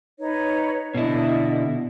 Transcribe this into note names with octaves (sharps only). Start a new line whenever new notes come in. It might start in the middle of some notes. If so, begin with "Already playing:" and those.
D#4 B4 C#5
B2 D3 E4 A4 D5 D#5